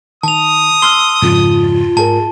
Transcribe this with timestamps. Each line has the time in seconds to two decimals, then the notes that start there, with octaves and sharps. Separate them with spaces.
0.23 D#3 A5 D#6 F7
0.82 C6 E6 F6 G7
1.22 F2 G#2 C#3 F4
1.97 G#2 G#4 A#4 A5